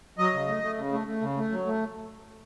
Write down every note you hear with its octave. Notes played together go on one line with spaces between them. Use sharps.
F#3 D#5
C#3
A3
A3
C#3
A3
A3
C#3
A3
F#3
A3